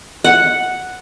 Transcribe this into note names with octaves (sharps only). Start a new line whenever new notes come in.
F#5